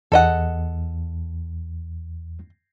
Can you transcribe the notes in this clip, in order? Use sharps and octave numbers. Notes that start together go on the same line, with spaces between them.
E2 A4 D#5 F#5